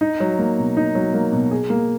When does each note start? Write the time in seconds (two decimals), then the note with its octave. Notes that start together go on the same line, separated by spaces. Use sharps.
0.01 D#4
0.20 F#3
0.39 A#3
0.58 B2
0.77 D#4
0.95 F#3
1.14 A#3
1.32 B2
1.51 G#4
1.70 A#3